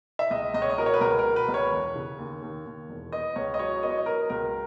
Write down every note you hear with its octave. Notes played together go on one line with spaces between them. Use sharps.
E5
C#2 D#5
C#2 D#5
C#5
D#5
B2 A#4
C#5
B4
C#2 A#4
A#4
B2
B4
C#2
C#5
E1
C#3
D#2
D#2
D#2
E1
B3 D#5
C#2 C#5
D#5
F#3 C#5
B3 D#5
C#5
D#5
F#3 A#4
C#2 A#4